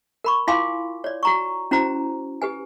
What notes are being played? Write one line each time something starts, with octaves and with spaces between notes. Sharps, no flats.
A#4 B5 C#6
E4 F4 F5 G#5 C6 D6
C#5 D5
F#4 A#5 C#6
C#4 E4 F#4 C5 A#5
G4 B4 G#5